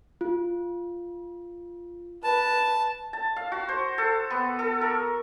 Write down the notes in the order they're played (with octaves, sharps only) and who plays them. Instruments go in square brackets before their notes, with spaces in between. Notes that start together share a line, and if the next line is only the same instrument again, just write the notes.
[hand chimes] F4
[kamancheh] B4 [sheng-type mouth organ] A5
[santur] A5
F5
F#4
C5
A4
B3
A4
A#4